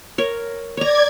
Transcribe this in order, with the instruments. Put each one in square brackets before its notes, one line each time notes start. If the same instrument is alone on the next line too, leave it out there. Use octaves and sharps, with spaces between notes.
[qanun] A#4 C#5
[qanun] C#5 A#5 [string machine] D5 G#6